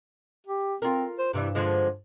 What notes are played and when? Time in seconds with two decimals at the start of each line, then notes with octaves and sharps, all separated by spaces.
0.47 G4
0.82 C4 F4 A#4
1.19 C5
1.33 G2 C3 E3 G3
1.55 D3 F3 G#3